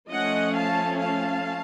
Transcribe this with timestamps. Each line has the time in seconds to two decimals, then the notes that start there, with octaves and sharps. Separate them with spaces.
0.11 F3 A3 C#4 D#5 F#5
0.55 F5 A5
0.99 F5 A5